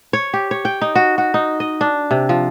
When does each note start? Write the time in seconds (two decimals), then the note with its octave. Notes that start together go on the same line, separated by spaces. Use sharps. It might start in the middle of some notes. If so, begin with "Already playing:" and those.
0.13 C#5
0.34 G4
0.51 C#5
0.65 G5
0.81 D#4
0.95 F#4
1.18 F#4
1.34 D#4
1.60 D#5
1.81 D4
2.11 C3
2.29 F3